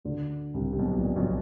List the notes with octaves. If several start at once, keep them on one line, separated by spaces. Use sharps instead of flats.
D2 D3
C2 C3
C3
B1 B2
A#1 A#2
B1 B2